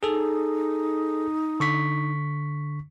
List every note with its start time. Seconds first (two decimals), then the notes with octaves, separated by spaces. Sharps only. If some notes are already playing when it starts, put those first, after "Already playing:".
0.03 D#4 G#4 A4
1.60 D3 C#6 B6